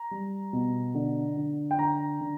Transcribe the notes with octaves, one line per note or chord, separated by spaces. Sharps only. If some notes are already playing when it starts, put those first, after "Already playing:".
Already playing: A#5
G3
B2
D3
D3
G5
D3 A#5
D3